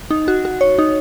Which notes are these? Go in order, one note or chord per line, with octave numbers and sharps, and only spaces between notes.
D#4
F#4
F#4
C#5
D#4